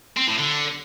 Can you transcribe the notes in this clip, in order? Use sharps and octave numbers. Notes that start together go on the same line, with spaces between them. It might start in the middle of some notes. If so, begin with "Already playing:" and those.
C4
A2
D3